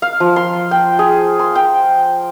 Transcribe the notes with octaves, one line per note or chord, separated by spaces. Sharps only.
F5
F3
C6
G5
G#4
C6
G5